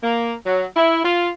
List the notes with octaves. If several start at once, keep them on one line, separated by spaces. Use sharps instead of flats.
A#3
F#3
E4
F4